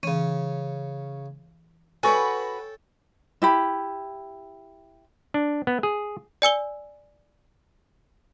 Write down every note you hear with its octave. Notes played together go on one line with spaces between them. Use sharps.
C#3 E3 C#4 D#7
F#4 A4 B4 C#5 G5 G#5 C#6
E4 G4 B5
D4
B3
G#4
D5 G#5 E6 G7